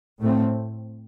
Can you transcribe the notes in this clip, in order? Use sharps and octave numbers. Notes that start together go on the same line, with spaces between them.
A2 A3 C4